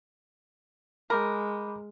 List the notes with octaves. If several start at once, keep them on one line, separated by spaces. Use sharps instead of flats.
G#3 A#4 B5 D6 G6